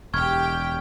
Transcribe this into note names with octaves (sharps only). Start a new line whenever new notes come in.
E1 G4 G5 C#6 F6 G#6